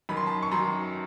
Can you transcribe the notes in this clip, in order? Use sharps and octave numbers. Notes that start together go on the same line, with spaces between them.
F#2 D#3 F#3 B5
C6
A5 B5
C#6
F#2 D#3 F#3 A#5 C6